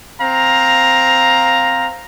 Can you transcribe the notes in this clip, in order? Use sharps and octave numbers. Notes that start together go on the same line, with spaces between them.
C4 F5 A#5